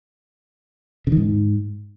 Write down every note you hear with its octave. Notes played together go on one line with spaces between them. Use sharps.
C#3
D#3
G#2